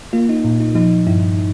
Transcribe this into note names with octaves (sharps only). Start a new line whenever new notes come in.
A#3 F4
D#4
A#2
D#4
F3 D#4
G2 E4